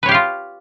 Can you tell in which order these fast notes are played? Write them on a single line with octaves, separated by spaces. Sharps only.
B4 C#5 G4 F5 F4